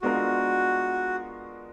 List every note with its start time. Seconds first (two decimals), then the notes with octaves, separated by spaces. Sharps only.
0.02 G#3 B3 D4 F4 F#4 A#4